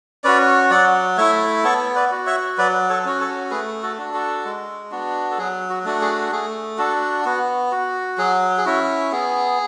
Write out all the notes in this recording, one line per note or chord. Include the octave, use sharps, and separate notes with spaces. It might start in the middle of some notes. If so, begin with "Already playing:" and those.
C#4 F#4 B4 D5
F#3 D5 F#5
A3 E4 C#5 E5
B3 A4 C#5
B4 D5
F#4
C#5 E5
F#3 B4 D5
A4 C#5
C#4 F#4
A4 C#5
A3 G#4 B4
F#4 A4
D4 F#4
F#4 A4
G#3
B3 D4 F#4
A4
F#3 G#4
F#4
A3 D4 F#4
G#4
A3 G#4
D4 F#4 A4
B3 F#4
F#4
F#3 G#4
G#4
C#4 E4 F#4
B3 G#4